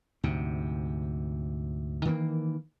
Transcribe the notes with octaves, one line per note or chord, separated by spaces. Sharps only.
D2 G#2 C3
D#3 E3 G#3 A#3